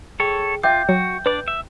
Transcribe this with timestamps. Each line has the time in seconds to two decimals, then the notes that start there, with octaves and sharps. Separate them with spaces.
0.20 G#4 A4 C#5 G5
0.63 F4 E5 G5 D6 G6
0.89 F#3 F#4
1.26 D4 B4 D5
1.48 E5